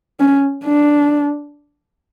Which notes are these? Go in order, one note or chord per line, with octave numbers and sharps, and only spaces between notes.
C#4
D4